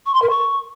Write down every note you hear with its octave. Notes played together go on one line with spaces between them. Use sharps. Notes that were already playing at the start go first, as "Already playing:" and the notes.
C#6
C6
A#4
C#6